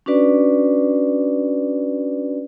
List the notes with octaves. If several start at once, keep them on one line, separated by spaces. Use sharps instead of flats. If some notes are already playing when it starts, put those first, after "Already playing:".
C#4 D4 F#4 B4 D5